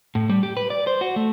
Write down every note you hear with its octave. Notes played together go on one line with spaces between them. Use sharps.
A2
G3
G4
B4
D5
C5
F#4
A3